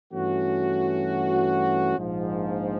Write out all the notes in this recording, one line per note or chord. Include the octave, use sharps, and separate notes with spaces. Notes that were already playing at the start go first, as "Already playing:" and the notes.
G2 E3 A3 C#4 F#4
A#1 G#2 F3